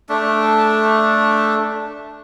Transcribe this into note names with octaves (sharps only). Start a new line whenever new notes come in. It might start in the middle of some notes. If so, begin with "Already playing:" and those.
A3 D4